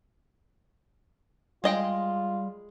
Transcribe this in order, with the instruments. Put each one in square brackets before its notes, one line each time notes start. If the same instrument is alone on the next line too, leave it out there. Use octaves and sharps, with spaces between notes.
[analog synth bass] G3 [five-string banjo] G#3 D#5 G5 [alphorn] F4